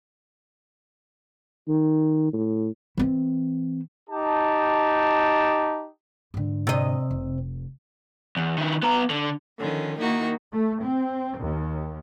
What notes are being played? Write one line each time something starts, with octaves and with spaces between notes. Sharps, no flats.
D#3
A2
E3 C4
D#4 G4 A5
G#2 D3
C3 D#5
F1
E2
D#3 E4
B3 A#5
D3
D3 D#3 F3 C#4
D#3 A#3 D#4 E4 F#4
A3
C4
D#2